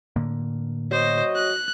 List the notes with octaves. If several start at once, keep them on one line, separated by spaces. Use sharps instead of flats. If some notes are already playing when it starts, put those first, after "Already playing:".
A2 D3 A#3
F#3 F#4 C5 D#5
F#6